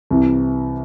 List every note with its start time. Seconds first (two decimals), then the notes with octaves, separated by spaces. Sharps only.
0.11 C2 C3 E3